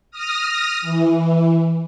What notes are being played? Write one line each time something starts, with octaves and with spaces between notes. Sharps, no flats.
D#6 F6 A#6
E3